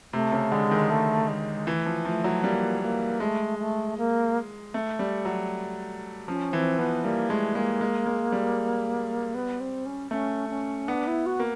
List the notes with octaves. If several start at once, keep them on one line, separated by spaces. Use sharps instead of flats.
C3 A3
C#3
D3 G#3
D#3
A3
G#3
E3 A3
F3
F3 A3
F#3
G3 A#3
A#3
G#3 A3
A3
A#3
A3
G3
F#3
F3 C#4
E3 C4
F3 B3
G3 A#3
G#3 A3
G#3 A#3
G#3
G#3
G3
B3
C4
C#4
A3 C#4
C#4
B3 D4
E4
F#4
A#3